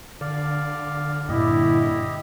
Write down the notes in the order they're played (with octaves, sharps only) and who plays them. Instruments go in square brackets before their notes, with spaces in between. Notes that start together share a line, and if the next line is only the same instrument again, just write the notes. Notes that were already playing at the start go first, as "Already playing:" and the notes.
[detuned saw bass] D3 [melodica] D5 F5
[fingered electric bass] G2 A#2 [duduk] E4 [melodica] G4 D#5